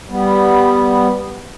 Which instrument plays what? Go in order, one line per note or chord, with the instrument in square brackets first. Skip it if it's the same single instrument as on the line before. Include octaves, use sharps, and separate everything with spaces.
[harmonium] G3 B3